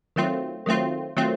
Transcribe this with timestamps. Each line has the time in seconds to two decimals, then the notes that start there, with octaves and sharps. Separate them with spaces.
0.16 D#3 F#3 A3 C4 F4
0.66 D#3 F#3 A3 C4 F4
1.17 D#3 F#3 A3 C4 F4